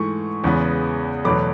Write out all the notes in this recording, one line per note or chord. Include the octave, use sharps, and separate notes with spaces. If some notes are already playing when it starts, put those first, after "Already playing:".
Already playing: G#2 E3 A3 C#6
E2 C#3 G#3 B3
E2 B2 F#3 A3 B5 D6